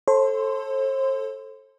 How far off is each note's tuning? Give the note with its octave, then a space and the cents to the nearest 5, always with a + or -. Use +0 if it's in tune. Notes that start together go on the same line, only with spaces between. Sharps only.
A4 +0 C5 +40 C6 -25